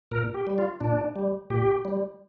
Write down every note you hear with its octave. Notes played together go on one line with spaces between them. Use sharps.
A#2 A#4
G4
G3
F4
A#2 D4
G3
A#2 G4
G3